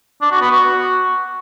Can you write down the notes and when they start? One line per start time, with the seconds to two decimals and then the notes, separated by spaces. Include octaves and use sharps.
0.22 D4
0.31 F#4
0.41 B3
0.51 F#4